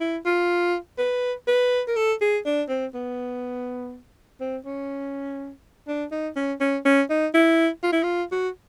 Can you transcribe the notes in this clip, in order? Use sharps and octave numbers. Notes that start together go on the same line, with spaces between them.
E4
F4
B4
B4
A#4
A4
G#4
D4
C4
B3
C4
C#4
D4
D#4
C#4
C#4
C#4
D#4
E4
F4
E4
F4
F#4